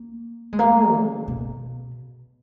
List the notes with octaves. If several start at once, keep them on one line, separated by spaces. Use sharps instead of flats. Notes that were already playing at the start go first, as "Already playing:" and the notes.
Already playing: A#3
G#3
A#3
C#3
B2